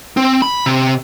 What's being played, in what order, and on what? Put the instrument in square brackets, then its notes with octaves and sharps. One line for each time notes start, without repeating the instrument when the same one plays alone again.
[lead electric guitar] C4
B5
C3